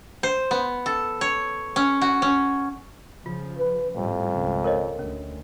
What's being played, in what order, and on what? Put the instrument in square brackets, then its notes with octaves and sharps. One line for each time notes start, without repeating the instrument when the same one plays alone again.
[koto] C5
B3
A4
C#5
C#4
F#4
C#4
[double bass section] C#3 F3 [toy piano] F4
[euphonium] B4
[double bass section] G#1 A2 G3 [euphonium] F2
[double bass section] C#2 C#3
[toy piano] A#4 C#5 D#5
[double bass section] D2 [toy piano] C#4